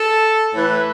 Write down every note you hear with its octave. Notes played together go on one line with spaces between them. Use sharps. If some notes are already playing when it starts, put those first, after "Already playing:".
Already playing: A4
A2 E3 B4